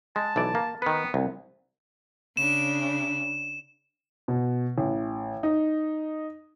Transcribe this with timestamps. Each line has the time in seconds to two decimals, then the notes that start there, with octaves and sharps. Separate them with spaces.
0.16 G#3 A5
0.36 B1 E3 D5
0.55 A#3
0.82 D#3 B3 B4
1.14 C2
2.37 C#3 D4 E7
4.28 B2
4.78 A1
5.43 D#4